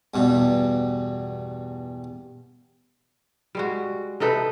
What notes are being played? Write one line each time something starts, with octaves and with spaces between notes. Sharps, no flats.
E2 G2 B2
G3 G#3 F#4
C3 D#4 A4 B4